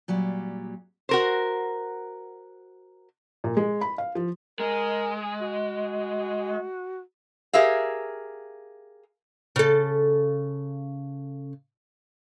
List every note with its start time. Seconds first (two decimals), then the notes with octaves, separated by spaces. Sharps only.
0.08 A#2 F#3 G3
1.09 F#4 A#4 C5
3.44 A#2
3.57 G#3
3.81 B5
3.98 F5
4.15 F3
4.60 G#3 A#4
5.41 F#4
7.53 G4 G#4 A#4 E5 F5
9.56 C#3 A4